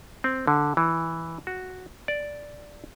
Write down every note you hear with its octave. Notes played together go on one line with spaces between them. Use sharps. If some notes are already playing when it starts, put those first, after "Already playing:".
C4
D3
E3
F#4
D5